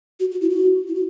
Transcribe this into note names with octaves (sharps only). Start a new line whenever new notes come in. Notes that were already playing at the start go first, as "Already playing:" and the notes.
F#4
F#4
E4
F#4
E4
F#4